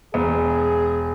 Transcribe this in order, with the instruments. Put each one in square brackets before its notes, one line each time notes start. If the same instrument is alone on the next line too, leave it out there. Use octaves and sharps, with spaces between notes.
[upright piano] E1 [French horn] G#4